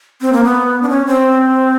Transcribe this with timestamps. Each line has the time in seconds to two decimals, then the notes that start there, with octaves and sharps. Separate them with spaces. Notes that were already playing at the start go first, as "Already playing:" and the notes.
0.21 C4
0.33 A#3
0.44 B3
0.82 D4
0.89 C#4
1.07 C4